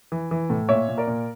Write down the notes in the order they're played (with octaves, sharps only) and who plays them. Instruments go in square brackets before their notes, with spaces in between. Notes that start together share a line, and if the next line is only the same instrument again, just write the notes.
[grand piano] E3
E3
A2
A#2 C#5 E5
A#2
A#4 D5
A#2